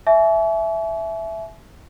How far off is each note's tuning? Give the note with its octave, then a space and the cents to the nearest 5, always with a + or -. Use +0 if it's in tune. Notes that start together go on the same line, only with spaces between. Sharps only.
E5 +0 G#5 +45 C#6 +45